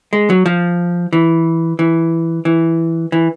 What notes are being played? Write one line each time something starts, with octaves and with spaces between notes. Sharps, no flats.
G#3
F#3
F3
E3
E3
E3
E3